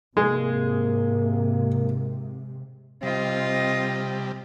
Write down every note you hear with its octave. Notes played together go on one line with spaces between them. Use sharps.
G#2 C3 G#3 A#3 G#4
C3 G3 C4 F4 D#5